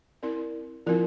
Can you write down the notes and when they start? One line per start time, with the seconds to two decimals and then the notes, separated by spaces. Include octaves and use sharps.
0.23 C4 E4 A#4 D5
0.86 F3 C4 E4 A#4 D5